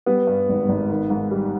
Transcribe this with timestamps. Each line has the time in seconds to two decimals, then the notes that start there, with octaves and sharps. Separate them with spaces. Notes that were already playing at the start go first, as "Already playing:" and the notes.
0.06 G3 B3
0.27 G2
0.49 G#1
0.69 G#1
0.89 D#3
1.10 G#2
1.31 G3